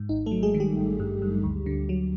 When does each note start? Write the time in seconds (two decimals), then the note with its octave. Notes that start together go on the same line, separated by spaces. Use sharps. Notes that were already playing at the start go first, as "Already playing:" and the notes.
Already playing: G#2
0.09 G#1 D#4
0.26 A3 A4
0.32 F#3
0.43 G#3 G#4
0.54 D#3
0.60 G3 G4
0.76 G#1
1.00 G2
1.22 G2
1.43 D2
1.66 D3
1.89 F#3